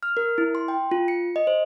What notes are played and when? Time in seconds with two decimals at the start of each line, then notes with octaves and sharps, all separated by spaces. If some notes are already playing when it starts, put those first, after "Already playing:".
0.03 F6
0.17 A#4
0.38 E4
0.55 C6
0.68 G5
0.91 F4
1.08 C#7
1.36 D#5
1.47 C5